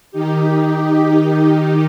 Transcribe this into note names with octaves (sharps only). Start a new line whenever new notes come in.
D#3 D#4 G4